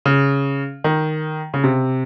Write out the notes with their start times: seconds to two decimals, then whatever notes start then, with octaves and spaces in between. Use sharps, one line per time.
0.06 C#3
0.84 D#3
1.54 C#3
1.64 C3